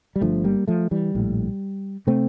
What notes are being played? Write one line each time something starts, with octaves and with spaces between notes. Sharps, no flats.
G3
G1 G2 D3 F3 A3
G3 A#3
F3 A3
E3 G3
A#1 A2
C3 A3 C4